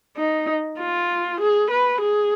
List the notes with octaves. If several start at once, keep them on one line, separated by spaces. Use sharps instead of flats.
D#4
F4
G#4
B4
G#4